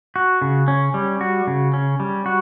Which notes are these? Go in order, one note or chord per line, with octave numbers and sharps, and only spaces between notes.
F#4
C#3
C#4
G3
F#4
C#3
C#4
G3
F#4